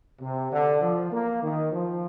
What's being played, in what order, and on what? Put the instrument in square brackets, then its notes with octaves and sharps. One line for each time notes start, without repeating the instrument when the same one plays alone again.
[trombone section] C3
D3
F3
A#3
D#3
F3